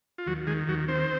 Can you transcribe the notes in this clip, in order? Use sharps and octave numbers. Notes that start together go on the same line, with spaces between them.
F4
D#2 F#3 F#4
D#3 G#3 G#4
D#2 F#3 F#4
D#3 C4 C5